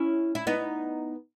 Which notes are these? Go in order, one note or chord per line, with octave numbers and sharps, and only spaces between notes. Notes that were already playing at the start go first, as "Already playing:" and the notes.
Already playing: C#4 E4
E4
B3 D#4